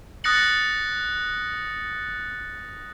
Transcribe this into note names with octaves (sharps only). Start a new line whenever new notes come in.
D#6 F#6 A6 A#6 C#7 F#7